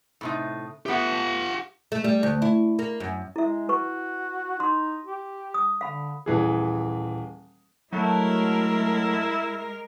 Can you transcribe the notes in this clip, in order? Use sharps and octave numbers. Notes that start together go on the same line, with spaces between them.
A2 C3 D#4
A3 B3 G4 F#5
A3
G3
D2
E4
A#3
F#2
G#3 E4 E5
F#4 B4 C#6
D#4 C6
G4
D#6
D3 F5 B5
D#1 E3 G#4
F#3 G#3 A3 E4 A#4